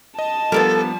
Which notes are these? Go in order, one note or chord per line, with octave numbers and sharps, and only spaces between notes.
D#5 A5
F3 G3 B3 D4 A4 A#4